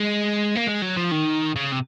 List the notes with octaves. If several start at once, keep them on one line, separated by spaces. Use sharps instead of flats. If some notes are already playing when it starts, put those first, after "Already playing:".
Already playing: G#3
A#3
G#3
F#3
F3
D#3
C#3
C3